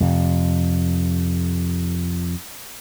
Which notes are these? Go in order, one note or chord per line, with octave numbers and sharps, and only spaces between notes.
F2 C3